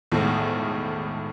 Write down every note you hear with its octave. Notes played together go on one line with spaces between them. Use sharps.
B1 E2 A2 D#3 F3 G#3